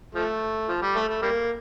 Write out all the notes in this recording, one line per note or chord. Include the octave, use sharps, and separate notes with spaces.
F3 A3
F3
G3
A3
A3
G3 A#3